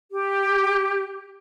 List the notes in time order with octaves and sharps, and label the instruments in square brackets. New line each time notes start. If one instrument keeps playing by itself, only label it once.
[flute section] G4